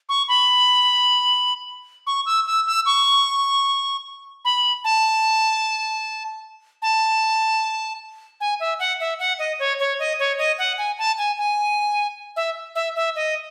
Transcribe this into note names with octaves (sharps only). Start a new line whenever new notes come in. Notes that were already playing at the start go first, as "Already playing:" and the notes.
C#6
B5
C#6
E6
E6
E6
C#6
B5
A5
A5
G#5
E5
F#5
E5
F#5
D#5
C#5
C#5
D#5
C#5
D#5
F#5
G#5
A5
G#5
G#5
E5
E5
E5
D#5